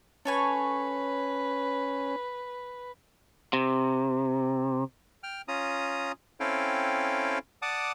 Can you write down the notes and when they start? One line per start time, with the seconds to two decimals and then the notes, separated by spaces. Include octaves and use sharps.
0.25 C#4 A4 B4 C#5 G#5
3.53 C3
5.23 G5 F6
5.48 C#4 F4 A#5 D#6
6.40 C4 C#4 E4 A4 F5 G5
7.62 D5 F#5 A5 D6 D#6